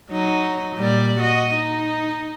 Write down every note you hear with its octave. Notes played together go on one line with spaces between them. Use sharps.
F#3 D#4
A#2 G3 D5
F#4 D#5
D#4